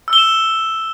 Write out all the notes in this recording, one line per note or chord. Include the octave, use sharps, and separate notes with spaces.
E6
G7
E7